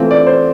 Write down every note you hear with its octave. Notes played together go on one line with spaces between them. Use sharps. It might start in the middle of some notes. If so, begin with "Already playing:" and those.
Already playing: E3 A3 C4 F4
D5
C5